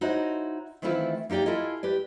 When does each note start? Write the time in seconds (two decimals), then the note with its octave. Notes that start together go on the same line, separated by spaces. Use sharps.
0.01 D#4 E4 F#4 C5 C#5 D#5
0.82 D#3 E3 A3 C4 E4 F4
1.30 A#3 D#4 G4 D5 G5
1.45 E4 F4 A4 D#5 G#5
1.83 G4 B4 D5